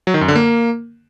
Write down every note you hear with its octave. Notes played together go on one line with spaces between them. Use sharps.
F#3
D#3
F#2
D3
A#3